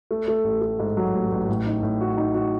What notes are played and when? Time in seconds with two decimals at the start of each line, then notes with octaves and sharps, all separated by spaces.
0.11 A3
0.28 A3
0.44 A1
0.62 A3
0.79 G#2
0.97 F#3
1.14 A1
1.32 A1
1.49 A2
1.66 D#4
1.83 A2
2.01 F#4
2.17 D#4
2.35 F#4